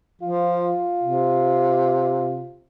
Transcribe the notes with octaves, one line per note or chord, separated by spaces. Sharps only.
F3 F4
C3